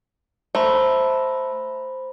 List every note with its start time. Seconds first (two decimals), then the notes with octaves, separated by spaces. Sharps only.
0.55 A3 C5 A#5 B5